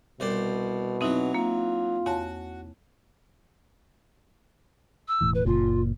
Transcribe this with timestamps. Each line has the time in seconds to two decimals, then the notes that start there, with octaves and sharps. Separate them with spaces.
0.20 C2 B2 C5 D5
1.01 E3 F#3 C4 D#4 E4
1.34 A#3 F4
2.06 E2 F#4 C#5 A5
5.08 E6
5.21 E1 A2 E3
5.34 B4
5.46 F#1 A#2 F4